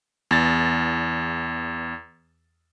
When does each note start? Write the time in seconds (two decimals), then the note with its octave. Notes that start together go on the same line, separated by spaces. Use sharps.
0.31 E2 A6